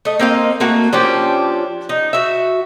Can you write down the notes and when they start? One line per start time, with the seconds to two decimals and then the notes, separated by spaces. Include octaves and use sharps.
0.05 A3 D#5
0.19 A#3 C4 D#5 F5
0.60 A3 A#3 F#4
0.93 F3 C#4 D4 G4
1.89 D#4
2.13 F#4 E5